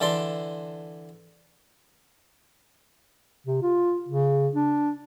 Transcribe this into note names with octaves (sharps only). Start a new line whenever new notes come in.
D3 E3 A4 D5 C6
C3
F4
C#3
D4